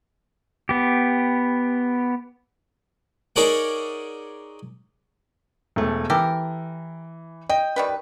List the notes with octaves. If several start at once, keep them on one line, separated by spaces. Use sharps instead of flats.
B3 G4
D#4 G#4 A#4 C#5 D5 F#5
E1 A3
E3 G4 A4 A#4
D#5 G5
D#3 G3 B4